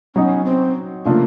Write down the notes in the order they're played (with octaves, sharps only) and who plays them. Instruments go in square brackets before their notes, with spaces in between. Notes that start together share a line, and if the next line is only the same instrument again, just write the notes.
[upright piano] F#3 B3 D#4 F#4 [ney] C#4
[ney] C4
[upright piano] C#3 F3 A3 D4 F4 [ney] A#3